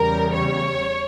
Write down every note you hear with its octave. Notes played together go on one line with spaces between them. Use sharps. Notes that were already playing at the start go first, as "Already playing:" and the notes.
Already playing: E2 C#3 G3 A#4
C#5